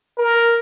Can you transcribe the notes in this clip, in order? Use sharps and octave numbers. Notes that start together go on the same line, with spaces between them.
A#4